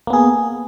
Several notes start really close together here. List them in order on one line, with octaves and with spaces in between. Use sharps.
A#3 B3 G#4